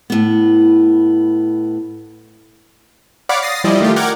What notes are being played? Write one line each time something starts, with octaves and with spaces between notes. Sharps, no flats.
A2 B3
C#5 D5 F5 F#5 B5 D6
D#6 A6 A#6 C7
F3 G3 E4 D5 D#5
D#3 A3 F4 G4
A#4 F#5 G5 D6 F6 G#6